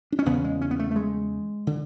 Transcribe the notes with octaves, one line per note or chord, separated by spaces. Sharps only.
D4
C#4
E2 C#3 B3
G#3
C#4
B3
A3
A3
G#3
D3